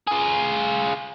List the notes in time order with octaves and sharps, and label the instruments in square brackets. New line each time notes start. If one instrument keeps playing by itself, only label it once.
[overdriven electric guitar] F4 G#4